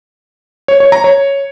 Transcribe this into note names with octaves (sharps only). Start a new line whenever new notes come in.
C#5
C#5
A#5
C#5